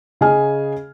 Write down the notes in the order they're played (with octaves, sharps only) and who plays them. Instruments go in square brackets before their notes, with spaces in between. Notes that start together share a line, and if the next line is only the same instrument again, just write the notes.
[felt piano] C#3 G#4 D#5 G#5 F6